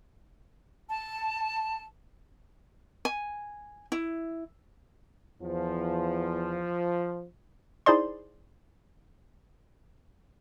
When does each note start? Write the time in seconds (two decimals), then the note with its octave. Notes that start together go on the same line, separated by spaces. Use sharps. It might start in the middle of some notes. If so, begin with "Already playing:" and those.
0.89 A5
3.05 G#5
3.92 E4
5.42 E2 F3
7.86 D#4 E4 G#4 C5 D5 C6